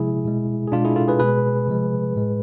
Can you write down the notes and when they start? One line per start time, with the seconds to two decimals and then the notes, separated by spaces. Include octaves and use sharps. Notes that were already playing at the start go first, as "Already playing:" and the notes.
Already playing: C3 F3 G#3 E4 G#4
0.25 B2 G#3
0.67 G#4
0.72 B2 G#3 D4 F4
0.85 E4 G#4
0.96 F4 A4
1.08 G#4 B4
1.19 B2 G#3 G#4 B4
1.67 C3 F3 G#3
2.15 A2 G#3